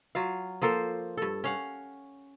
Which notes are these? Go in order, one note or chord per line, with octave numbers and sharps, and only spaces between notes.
F#3 F4 F5
F3 A#3 A4 C5
G2 A4
C#4 F5 F#5